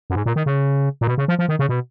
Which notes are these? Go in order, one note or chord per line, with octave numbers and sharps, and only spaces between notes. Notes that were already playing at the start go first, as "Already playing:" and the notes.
F#2
G#2
A#2
D#3
C#3
A#2
B2
C#3
F3
F3
D#3
C#3
B2